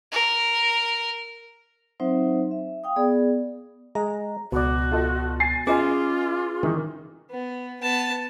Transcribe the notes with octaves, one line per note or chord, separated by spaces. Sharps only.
A#4
F#3 C4 D#4 C5 E5
E5
F5 G5 D#6
B3 G#4 D5
G#3 A#5
C#2 B2 F#4 D5
F4 A4 D#5
G#5 A6 C7
C#4 F4 G#4 B4 D#5 G#5 D6
D#3 E3
B3
B3 A5